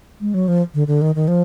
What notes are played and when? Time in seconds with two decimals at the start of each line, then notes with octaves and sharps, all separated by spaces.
0.21 G#3
0.34 F#3
0.48 F3
0.74 D3
0.87 D3
1.02 D#3
1.15 D#3
1.28 F3